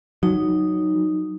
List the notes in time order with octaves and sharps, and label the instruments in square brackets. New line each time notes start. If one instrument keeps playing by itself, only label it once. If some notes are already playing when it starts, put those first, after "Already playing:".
[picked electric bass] F#3 [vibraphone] D#4